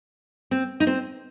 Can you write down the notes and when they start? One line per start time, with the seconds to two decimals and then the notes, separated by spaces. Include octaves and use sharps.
0.51 C4
0.80 D#4
0.87 C4